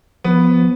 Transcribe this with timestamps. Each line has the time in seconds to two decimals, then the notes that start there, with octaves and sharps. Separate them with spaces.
0.24 F3 B3